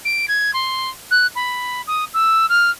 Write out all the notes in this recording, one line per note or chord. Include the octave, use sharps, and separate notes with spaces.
D7
G#6
C6
F#6
B5
D#6
E6
F6